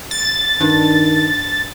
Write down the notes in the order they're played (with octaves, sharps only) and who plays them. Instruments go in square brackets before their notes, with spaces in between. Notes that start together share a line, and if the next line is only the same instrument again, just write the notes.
[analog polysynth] A6
[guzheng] G2 D4 [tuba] D#3